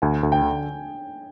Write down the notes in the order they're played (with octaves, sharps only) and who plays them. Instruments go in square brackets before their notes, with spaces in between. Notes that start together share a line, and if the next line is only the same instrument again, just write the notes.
[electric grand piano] D2 [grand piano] G#5
[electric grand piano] D2
[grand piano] G5
[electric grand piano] D3